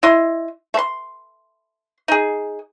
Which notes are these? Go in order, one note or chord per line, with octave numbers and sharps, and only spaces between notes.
E4 D#5 C6
A3 C6
D#4 G#4